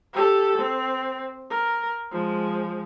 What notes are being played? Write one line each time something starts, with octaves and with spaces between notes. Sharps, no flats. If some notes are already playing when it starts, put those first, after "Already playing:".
G4 A4
C4
A#4
F3 G#3